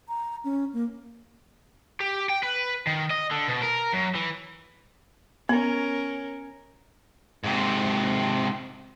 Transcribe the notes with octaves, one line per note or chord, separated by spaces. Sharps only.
A#5
C#4
A#3
G4
G5
B4
D#3
D#5
D3
B2
A#4
F#2
E3
B3 C#4 A#4
G#2 C3